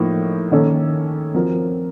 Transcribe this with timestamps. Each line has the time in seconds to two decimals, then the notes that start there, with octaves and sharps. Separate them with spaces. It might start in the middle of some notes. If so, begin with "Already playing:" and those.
Already playing: A2 F3 A#3 D#4
0.52 D#3 A#3 C#4 A4
1.34 F3 C4 F#4 A#4